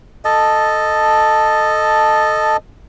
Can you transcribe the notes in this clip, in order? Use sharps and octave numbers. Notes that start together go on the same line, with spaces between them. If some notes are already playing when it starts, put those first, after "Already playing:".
A4 D#5 A5